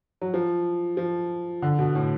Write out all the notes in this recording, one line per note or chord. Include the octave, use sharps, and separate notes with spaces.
F#3
F3
F3
D3
B2
A2